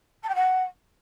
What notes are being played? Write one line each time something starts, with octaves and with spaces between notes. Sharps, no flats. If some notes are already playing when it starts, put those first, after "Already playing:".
A5
G5
F#5